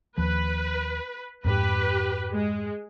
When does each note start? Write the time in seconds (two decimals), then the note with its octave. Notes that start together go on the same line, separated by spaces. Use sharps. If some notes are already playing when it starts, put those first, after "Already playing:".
0.18 D#2 F3 B4
1.45 F2 G#2 G4 B4
2.33 G#3